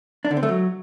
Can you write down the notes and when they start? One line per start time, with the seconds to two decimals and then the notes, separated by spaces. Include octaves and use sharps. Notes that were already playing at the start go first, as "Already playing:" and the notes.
0.25 D4
0.31 D3
0.37 C4
0.43 A3
0.49 F#3